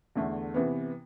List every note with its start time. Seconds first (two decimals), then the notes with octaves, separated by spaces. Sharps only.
0.15 E2 D3 A3
0.54 C3 E3 B3